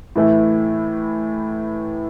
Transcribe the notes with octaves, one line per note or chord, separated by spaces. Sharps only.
A2 E3 A3 E4